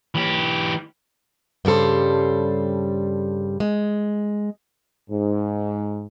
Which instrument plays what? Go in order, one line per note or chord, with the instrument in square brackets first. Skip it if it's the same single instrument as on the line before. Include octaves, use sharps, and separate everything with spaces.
[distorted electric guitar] E3 G4
[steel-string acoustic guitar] G2 C#3 G3 A4 C5
G#3
[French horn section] G#2